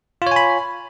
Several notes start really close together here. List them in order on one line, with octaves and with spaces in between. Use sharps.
F4 C#5 G#5 B5